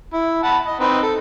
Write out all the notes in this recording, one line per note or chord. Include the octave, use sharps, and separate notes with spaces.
E4
F#5 A5 B5
D#5
C4 D#4 B4
A4